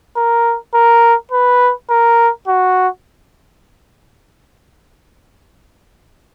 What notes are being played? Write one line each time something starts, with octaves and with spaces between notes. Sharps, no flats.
A#4
A#4
B4
A#4
F#4